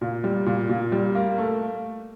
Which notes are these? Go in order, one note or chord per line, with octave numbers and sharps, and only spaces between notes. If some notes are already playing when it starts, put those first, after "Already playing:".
A#2
G3
A#2
A#2
G3
A#3
A3